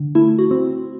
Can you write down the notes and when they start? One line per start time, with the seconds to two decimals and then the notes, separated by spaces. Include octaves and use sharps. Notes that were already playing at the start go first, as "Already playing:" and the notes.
Already playing: D3
0.15 A3 E4
0.39 F#4
0.51 C4